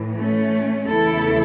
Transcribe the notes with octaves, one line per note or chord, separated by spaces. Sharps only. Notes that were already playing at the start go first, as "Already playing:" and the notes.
Already playing: A2 E3
A3 C#4
E2 C#3 E3 A3 E4 A4